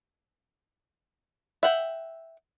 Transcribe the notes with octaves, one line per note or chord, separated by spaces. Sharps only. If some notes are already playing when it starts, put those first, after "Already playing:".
E5 F#5 G5